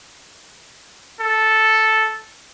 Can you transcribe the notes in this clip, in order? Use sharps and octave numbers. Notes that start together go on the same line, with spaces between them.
A4